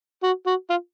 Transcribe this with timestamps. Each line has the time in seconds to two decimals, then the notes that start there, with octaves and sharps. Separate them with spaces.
0.23 F#4
0.47 F#4
0.70 F4